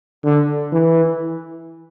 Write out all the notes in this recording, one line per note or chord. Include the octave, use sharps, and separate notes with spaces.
D3
E3